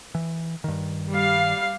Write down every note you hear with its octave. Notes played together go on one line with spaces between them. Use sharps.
E3
G2 D#3
G3 F5